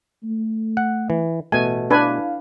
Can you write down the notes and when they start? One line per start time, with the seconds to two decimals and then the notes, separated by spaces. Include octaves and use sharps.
0.23 A3
0.77 F#5
1.10 E3
1.52 A1 B2 A3 G#5
1.91 D4 E4 B4 F5 G#5